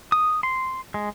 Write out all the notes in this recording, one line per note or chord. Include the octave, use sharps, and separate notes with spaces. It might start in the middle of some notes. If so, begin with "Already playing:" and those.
D#6
C6
G#3